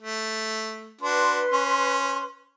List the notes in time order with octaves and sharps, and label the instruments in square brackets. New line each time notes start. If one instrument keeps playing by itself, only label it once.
[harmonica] A3
[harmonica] D4 F#4 [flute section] B4 C6
[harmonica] C#4